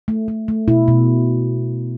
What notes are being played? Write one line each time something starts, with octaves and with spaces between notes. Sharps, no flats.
A3
A3
A3
B2 E4
B2